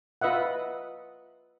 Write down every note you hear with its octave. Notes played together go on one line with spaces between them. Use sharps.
F4 B4 D#5 E5 F#5